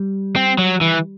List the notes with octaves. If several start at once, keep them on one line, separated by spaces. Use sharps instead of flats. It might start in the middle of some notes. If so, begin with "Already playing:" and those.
Already playing: G3
C4
F#3
E3